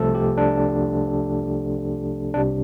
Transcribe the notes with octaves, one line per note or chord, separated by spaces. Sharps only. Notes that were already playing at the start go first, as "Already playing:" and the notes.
Already playing: C2 C3 F3 A3 A4
G4
D4
C2 C3 G3 D4